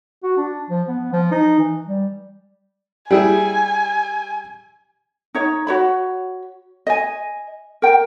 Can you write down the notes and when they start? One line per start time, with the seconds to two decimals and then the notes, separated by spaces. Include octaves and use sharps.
0.23 F#4
0.37 D4
0.70 F3
0.88 B3
1.13 F3
1.31 D#4
1.59 E3
1.87 G3
3.11 G3 E4 G#4 G#5
5.35 D#4 C#5
5.67 F#4 C#5 B5
6.87 D#5 G#5
7.82 A#4 G5